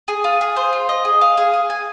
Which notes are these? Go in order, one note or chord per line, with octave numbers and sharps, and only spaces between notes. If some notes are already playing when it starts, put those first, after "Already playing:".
G#4
F4
G#4
C5
F4
D#5
G#4
F5
G#4
G#4
G#5